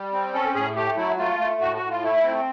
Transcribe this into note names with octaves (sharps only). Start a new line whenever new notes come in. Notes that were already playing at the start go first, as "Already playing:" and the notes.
Already playing: G3
C4
C#4 A4
A2 G#4
A3 G4
F#3 E4
A3 F4
A3
A2 F#4
F#4
A2
F4
A3 E4
C4